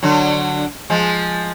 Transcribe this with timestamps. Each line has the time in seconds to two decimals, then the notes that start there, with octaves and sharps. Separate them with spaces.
0.03 D3 F#3
0.90 F3 G#3